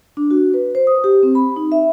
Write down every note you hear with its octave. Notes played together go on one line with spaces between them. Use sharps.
D4
F#4
B4
C5
D#6
G4
C4
B5
D#4
E5